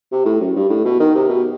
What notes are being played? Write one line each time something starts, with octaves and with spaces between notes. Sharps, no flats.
C3
A2
F#2
G2
A2
B2
D#3
C3
B2